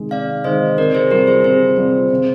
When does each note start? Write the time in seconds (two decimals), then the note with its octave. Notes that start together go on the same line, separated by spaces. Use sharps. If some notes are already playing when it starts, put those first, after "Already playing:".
Already playing: C3 D#3 G#3
0.11 C3 D5 F5
0.44 D#3 G#3 C5 D#5
0.78 C3 A#4 D5
0.95 G#4 C5
1.11 G3 C4 F4 G4 A#4
1.27 G#4 C5
1.44 C3 G#4 C5
1.78 G3 C4 F4
2.11 C3